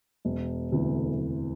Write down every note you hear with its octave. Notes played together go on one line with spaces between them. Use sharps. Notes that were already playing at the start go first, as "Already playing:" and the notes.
E1
D2 C3 E3 A3
E1